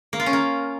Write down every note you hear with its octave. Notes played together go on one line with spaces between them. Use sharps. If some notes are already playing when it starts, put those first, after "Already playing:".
A#3
F4
C#4
A#3